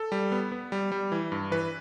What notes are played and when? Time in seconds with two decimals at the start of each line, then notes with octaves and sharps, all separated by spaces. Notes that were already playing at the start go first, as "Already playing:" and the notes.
Already playing: A4
0.12 G3
0.32 B3
0.52 B3
0.72 G3
0.92 G3
1.12 E3
1.32 G2
1.51 E3 B4